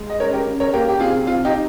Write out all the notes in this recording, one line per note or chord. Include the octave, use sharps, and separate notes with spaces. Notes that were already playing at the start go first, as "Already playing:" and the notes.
Already playing: G#3
D#5
C#3 A#4 C#5
G4 A#4
C#3
A#4 C#5
A#3 G4 A#4
G4
C3 F4 G#4
C3 F4
D#4 G4